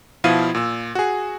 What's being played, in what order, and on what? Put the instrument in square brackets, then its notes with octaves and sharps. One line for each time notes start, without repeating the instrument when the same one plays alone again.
[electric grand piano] B2 F3 E4 F5 G#6 D#7
A#2 E6
F#4 G#4